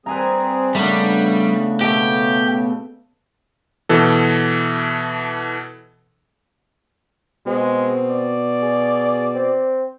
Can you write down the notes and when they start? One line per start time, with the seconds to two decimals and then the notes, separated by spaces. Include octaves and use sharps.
0.06 G3 C4 G#4 B4 G#5 A#5
0.75 C#3 G3 A3 B3 D4
1.81 B2 A3 G4
2.48 C#3
3.89 B2 E3 A4
7.46 B2 G#3 C4
8.10 D5
8.62 G#4
9.35 C4